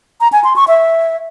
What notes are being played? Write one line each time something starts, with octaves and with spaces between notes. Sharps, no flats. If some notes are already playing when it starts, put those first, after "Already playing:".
A#5
G#5
C6
C#6
E5